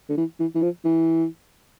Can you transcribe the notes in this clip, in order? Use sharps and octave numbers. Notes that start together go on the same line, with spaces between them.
D3
E3
E3
E3
F3
E3